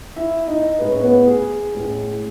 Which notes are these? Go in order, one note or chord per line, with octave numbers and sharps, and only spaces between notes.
E4 E5
D#4 D#5
A2 G#3 C#4 B4
C#5
B3 B4
G#4
A2 G#3 C#4